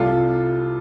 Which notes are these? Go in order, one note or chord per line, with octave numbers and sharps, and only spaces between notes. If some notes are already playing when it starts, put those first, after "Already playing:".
Already playing: C2 C3 G3 F4 A4